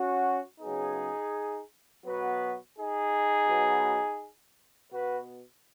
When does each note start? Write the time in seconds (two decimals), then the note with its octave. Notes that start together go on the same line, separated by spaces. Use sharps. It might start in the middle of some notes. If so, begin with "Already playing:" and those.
Already playing: C#4 F#4
0.60 C#3 F#3 B3 D#4 G#4
2.04 B2 F#3 B3 F#4 B4
2.76 D#4 G#4
3.48 B2 F#3 B3
4.91 B2 B3 F#4 B4